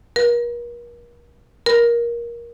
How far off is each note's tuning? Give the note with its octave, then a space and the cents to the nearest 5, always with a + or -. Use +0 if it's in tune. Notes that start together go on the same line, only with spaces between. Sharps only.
A#4 +40
A#4 +15